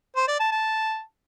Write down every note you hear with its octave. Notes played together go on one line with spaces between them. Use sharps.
C5
D5
A5
A5